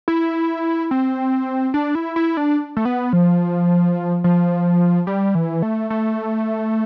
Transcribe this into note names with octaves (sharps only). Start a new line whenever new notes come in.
E4
C4
D4
E4
E4
D4
A3
B3
F3
F3
G3
E3
A3
A3